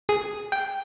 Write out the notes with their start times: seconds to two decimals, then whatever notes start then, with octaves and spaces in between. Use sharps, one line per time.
0.09 G#4
0.52 G5